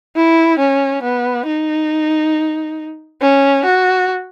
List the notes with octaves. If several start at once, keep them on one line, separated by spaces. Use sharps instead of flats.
E4
C#4
B3
D#4
C#4
F#4